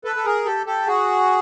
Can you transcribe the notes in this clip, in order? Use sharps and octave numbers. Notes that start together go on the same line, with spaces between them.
A4 B4
A4
G#4 A#4
G4 A4
G4 A4
F#4 G#4